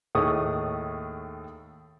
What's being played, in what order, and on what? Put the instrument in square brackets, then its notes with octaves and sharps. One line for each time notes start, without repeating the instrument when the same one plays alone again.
[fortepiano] D#2 A2 G#4 C#6 D#6